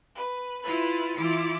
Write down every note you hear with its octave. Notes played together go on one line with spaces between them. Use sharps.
B4
E4 F4 B4
E3 E4 F4 D6 A6